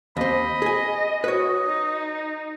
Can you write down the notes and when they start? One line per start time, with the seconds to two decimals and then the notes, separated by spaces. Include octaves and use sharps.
0.17 D#2 C4 D#5 B5
0.62 G#4 G#5
1.24 F#4 B4 C#5 D#5
1.65 D#4